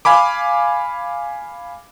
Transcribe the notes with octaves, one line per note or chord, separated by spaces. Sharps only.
F5 G#5 B5 D6